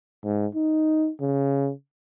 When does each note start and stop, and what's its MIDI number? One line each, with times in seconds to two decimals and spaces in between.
0.24 0.46 44
0.55 1.10 63
1.21 1.71 49